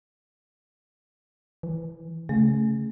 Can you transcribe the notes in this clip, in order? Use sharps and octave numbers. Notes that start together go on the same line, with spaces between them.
E3
C#3 A3